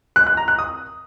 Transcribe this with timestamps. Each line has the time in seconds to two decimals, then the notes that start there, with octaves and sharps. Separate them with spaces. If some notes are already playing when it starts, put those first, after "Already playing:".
0.16 F#6
0.27 F#6
0.37 A#5
0.48 F#6
0.59 D#6